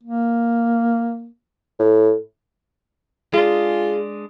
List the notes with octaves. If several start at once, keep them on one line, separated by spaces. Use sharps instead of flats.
A#3
A2
G#3 D4 F4 G#4